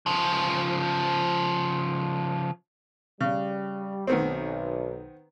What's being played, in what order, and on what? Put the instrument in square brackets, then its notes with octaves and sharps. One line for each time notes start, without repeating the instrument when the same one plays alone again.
[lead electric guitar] C#3 F3
[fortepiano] C#3 [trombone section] G3
[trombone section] B1 [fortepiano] D#3 B3 C4